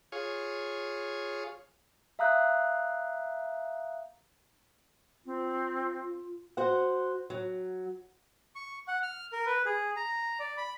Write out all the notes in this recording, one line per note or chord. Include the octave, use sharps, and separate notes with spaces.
F4 G#4 C#5
E5 F5 A#5 D#6 F#6 G6
C4 F4
F#4 C5 F#5
F#3
C#6
F#5
F6
A#4
B4
G#4
A#5
D5
B5